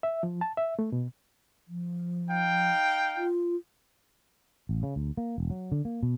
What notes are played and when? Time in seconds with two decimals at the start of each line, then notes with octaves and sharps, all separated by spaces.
0.03 E5
0.23 F3
0.41 A5
0.57 E5
0.79 A3
0.92 B2
1.68 F3
2.29 D#4 F5 G5
3.17 F4
4.69 A1
4.83 C#3
4.96 D2
5.17 A#3
5.38 E1
5.50 F#3
5.72 D3
5.85 A#3
6.03 B2